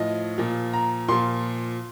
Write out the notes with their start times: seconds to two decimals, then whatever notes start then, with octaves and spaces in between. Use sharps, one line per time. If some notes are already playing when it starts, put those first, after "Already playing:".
Already playing: A2 F3 D#5
0.38 A#2 F3
0.73 A#5
1.08 A#2 F3 C6